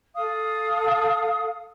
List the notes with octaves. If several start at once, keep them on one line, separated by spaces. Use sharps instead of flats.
A4 F5 D#6